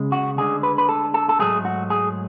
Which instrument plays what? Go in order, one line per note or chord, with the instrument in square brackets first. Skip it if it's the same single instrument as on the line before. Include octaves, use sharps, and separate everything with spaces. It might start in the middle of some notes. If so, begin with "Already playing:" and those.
Already playing: [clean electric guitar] C#2 C#3 G#3
F#4
D2 D3 G#3 G#4
B4
B4
A4
A4
A4
G#2 F#3 A3 G#4
F#4
G#4